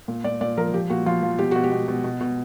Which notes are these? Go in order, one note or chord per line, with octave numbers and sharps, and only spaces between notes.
A#2
A#2 D5
A#2 D5
F3 A#4
F3 G4
A#2 F#4
F3 F4
F3
B2 G4
B2 F#4
G4
B2
B2
B2
B2